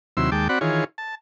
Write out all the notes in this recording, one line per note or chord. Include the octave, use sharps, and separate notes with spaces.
D#2 C3 F#3 E4 C6 E6
D#2 G#3 G5 A5 D6
C4 F#4 D5 F#5 B5
D#3 E3 F4 G#4 C#5
A5